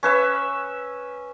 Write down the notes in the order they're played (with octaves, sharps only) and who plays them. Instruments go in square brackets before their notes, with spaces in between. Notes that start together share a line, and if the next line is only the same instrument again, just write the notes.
[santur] C#4 B4 E5